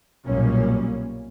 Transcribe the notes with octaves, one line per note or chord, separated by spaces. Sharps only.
B1 F#2 A#2 G3 A#3 C#4